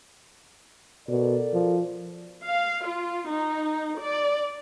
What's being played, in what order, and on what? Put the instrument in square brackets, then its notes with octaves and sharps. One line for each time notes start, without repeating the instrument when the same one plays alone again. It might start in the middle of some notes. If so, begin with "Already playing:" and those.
[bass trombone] B2 [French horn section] A4 A#4 D5
[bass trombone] F3
[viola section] F5
F4
D#4
D5